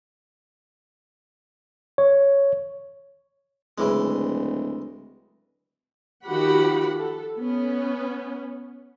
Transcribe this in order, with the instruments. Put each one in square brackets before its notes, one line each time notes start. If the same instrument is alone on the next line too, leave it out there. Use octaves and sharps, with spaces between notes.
[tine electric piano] C#5
[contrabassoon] D1 [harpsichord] C#3 E3 G#3
[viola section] D#3 F3 F#4 G4 F#5 B5
A4
B3 C#4